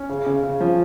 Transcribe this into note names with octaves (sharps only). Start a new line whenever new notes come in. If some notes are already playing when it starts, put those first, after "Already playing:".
Already playing: C#4
C#3
C#3
C#3
F3